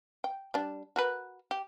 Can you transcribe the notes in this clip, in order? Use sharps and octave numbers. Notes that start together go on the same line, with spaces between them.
G5
G3 D4
F#4 A#4 B4
G4